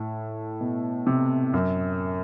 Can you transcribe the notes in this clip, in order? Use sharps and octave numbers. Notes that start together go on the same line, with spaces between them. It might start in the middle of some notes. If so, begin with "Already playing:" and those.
Already playing: A2
B2
C3
F#2